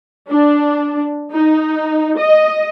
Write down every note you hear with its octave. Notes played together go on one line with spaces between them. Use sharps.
D4
D#4
D#5